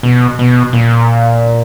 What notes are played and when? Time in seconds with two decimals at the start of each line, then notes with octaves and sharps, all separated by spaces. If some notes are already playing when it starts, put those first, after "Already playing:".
0.03 B2
0.39 B2
0.73 A#2